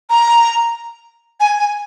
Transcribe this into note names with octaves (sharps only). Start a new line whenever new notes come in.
A#5
G#5
G#5